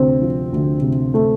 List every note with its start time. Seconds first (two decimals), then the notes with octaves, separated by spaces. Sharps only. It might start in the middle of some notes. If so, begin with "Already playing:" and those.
Already playing: D2 C3 C4
0.21 F3
0.52 D2
0.82 C3
1.14 A3